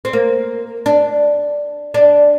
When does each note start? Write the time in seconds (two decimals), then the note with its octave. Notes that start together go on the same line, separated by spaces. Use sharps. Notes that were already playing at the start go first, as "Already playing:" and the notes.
0.05 C4
0.13 A#3
0.86 D4
1.94 D4